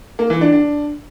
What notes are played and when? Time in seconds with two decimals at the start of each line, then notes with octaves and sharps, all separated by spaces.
0.19 A#3
0.30 E3
0.41 D4
0.52 D4